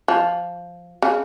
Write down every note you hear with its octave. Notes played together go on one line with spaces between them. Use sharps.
F3
C#3